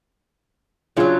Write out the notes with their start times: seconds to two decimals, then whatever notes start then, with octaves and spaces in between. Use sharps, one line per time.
0.97 C#3 F#3 D4 F4 C#5